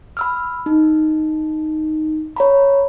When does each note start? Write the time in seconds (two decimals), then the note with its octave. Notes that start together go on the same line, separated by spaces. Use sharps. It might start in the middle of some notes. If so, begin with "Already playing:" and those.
0.17 B5 E6 F6
0.66 D#4
2.36 C#5 A#5 B5